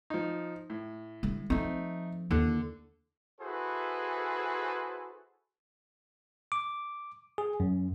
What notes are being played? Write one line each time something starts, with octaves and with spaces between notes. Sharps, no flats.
F3 D#4
A2
D3 G3
F3 A3 C4 D#4
D#2 D3 E4
E4 F#4 G#4 A4 B4 C5
D6
G#4
F#2